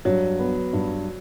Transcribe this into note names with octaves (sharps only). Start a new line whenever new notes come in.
G2 F#3
B3
G2